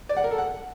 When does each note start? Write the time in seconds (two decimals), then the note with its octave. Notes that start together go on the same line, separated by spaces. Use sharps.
0.09 D5
0.17 F#5
0.24 A#4
0.31 A4
0.38 F#5